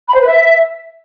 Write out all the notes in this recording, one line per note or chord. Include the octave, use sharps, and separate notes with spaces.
B5
C5
B4
E5